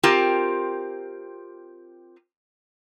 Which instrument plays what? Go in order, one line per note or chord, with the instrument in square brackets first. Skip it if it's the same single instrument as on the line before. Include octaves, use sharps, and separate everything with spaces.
[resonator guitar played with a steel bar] C4 F4 G4 A#4